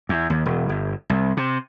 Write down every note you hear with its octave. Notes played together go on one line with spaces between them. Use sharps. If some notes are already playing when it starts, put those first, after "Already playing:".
E2
D#2
E1
G1
C2
C3